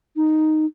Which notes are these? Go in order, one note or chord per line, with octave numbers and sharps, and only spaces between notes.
D#4